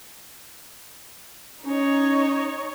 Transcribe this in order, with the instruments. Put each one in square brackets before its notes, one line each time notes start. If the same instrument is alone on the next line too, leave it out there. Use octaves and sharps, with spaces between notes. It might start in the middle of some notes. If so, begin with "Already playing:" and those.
[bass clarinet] C#4 [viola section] D#4 C#5